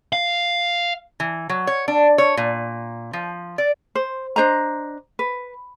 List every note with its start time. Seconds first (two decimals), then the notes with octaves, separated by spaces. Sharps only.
0.13 F5
1.20 E3
1.49 F#3
1.67 C#5
1.88 D4
2.18 C#5
2.37 A#2
3.13 F3
3.58 D5
3.95 C5
4.36 D4 C5 D#5 A#5
5.19 B4